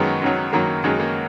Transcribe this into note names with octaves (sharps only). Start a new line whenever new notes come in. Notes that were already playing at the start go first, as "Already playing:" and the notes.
Already playing: F#2 D#3 F#3 G#3 B3
F#2 D#3 F#3
F#2 D#3 F#3 A#3
F#2 D#3 F#3 G#3
A#3